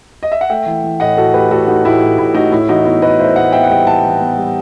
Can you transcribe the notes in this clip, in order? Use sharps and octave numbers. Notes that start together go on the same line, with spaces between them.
D#5
E5
F#5
A3 E5 G5
E3
E3
A2 D#5 F#5
A2 F#4 A4
A3 G4 B4
A2 F#4 A4
A3 D#4 F#4
A2 E4 G4
A2
A2 E4
A3 D#4 F#4
A2 E4
E3 D#4 F#4
B3 E4
A2 B4 D#5
A2 C5 E5
A2 D#5 F#5
B3 E5 G5
F#5
G3 E5 G5
E3 F#5 A5
E3
B3
G3